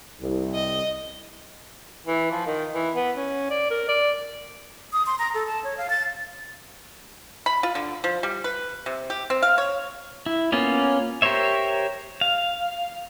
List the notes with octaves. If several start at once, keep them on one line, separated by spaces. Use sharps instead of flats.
C2
D#5
E3
F3
D#3
E3
B3
C#4
D5
A#4
D5
D#6
C6
A#5
A4
A5
C#5
F5
A6
B5
F4
D3
F3
G3
B4
C3
G4
C4
F5
C#5
E4
A#3 B3 C#4 F4
G4 A#4 C5 C#5 E5
F5